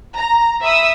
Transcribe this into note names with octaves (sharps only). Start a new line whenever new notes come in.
A#5
E5 B5 D#6 E6